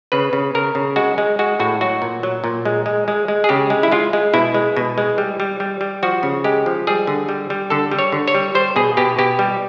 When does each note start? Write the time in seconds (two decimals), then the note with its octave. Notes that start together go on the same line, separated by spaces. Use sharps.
0.12 C#3 B4
0.33 C#3
0.55 C#3 A#4
0.75 C#3
0.96 G#3 F#4
1.18 G#3
1.39 G#3 F#4
1.59 A2 F#4
1.81 F#3 F#4
2.02 A#2
2.23 F#3
2.44 A#2
2.65 G#3
2.86 G#3
3.08 G#3
3.28 G#3
3.44 G#4
3.49 C#3 G4
3.70 G#3
3.83 E4
3.92 G#3 F4
4.13 G#3
4.34 B2 E4
4.54 G#3
4.77 B2
4.98 G#3
5.18 G3
5.40 G3
5.60 G3
5.81 G3
6.03 F3 F#4
6.23 C#3
6.44 G#3 G4
6.66 F3
6.87 G3 G#4
7.07 D3
7.29 G3
7.50 G3
7.70 D3 A4
7.91 G3
7.99 C#5
8.12 D3
8.28 C#5
8.35 G3
8.55 G3 C5
8.76 B2 G#4
8.97 B2 G4
9.18 B2 G4
9.39 G3